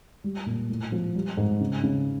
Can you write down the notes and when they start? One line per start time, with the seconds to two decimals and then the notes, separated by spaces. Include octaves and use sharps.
0.24 G3
0.46 A#2
0.69 A2
0.92 F3
1.15 G3
1.37 G#2
1.61 C#3
1.84 C#3